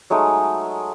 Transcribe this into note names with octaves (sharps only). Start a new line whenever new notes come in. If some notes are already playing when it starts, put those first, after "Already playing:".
F#3 G#3 A3 D#4